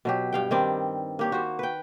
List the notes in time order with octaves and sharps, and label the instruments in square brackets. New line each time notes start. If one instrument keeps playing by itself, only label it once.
[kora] B2 F#3 G4
G2 F5 G5
D#3 G3 C4 D5
A#3 G4 C#5
F#4 C5
B4 G5